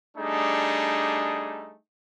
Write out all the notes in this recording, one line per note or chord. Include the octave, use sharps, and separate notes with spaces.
G3 A3 D4 D#4 G#4